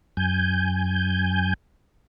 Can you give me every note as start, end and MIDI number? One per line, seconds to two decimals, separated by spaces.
0.17 1.54 42
0.17 1.54 80
0.17 1.54 91